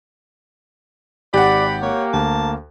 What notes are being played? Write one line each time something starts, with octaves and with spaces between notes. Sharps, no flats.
G#1 G4 D5 F#5 B5 F#6 A6
A#3 C#5
D2 A5